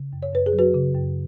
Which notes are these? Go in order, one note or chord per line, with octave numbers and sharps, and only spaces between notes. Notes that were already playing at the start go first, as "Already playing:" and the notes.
Already playing: C#3
F#2
C#5
F#2 B4
G#4
F#3
F#4 B4
C#3
F#2